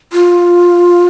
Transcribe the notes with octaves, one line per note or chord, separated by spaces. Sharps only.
F4